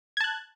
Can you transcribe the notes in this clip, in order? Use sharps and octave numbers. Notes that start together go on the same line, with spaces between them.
A5 F#6 G#6